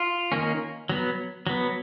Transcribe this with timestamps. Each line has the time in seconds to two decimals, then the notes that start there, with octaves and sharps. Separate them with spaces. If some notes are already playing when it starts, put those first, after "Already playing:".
Already playing: F4
0.32 D#3 A#3 C#4
0.89 F#3 B3
1.47 F#3 B3